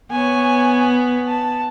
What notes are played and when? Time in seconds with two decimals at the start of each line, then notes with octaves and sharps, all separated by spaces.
0.11 B3 C#5 G#5
1.29 A5